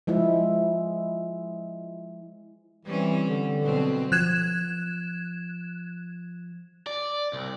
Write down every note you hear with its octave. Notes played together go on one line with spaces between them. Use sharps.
F3 G#3 E4
E3 G3 C4 C#4
D3
B2 F#3 C4
F3 F#6 G#6 E7
D5
C2